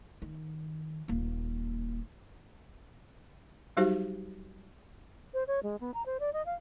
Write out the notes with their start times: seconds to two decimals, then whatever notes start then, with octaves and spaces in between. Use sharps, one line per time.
0.22 D#3
1.08 D#1 A#3
3.77 F#3 G3 D#4 F#4 G4 C5
5.34 C5
5.47 C#5
5.63 G#3
5.81 B3
5.94 A#5
6.06 C5
6.20 D5
6.33 D#5
6.46 F5